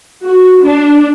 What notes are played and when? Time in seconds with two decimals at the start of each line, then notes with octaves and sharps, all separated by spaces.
0.24 F#4
0.63 D4